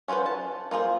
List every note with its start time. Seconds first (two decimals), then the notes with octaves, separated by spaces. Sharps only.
0.08 C#4 F4 G#4 B4 C5
0.26 A5
0.71 A#3 F4 G#4 C5